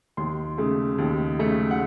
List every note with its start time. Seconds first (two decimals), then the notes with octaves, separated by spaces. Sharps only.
0.17 D#2 C6
0.58 C#3 A3
0.98 D#2
1.39 C#3 A3
1.71 F#5